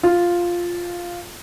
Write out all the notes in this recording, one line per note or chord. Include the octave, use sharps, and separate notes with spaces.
F4